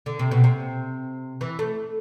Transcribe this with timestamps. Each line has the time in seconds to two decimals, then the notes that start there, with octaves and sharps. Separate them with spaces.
0.06 D3
0.19 C3
0.31 B2
0.44 C3
1.41 E3
1.59 A3